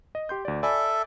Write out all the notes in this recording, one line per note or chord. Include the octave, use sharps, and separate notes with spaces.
D#5
G4 C6 G6
D2 D5
A4 D5 E5 G#5 B5